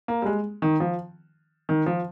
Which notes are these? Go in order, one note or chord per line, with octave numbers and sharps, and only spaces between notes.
A#3
G3
G#3
D#3
F3
D#3
F3